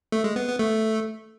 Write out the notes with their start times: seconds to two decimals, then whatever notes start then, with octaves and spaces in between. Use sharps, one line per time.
0.12 A3
0.24 G#3
0.36 B3
0.48 B3
0.59 A3